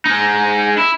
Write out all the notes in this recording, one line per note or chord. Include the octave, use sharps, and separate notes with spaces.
G#3 D#4
E4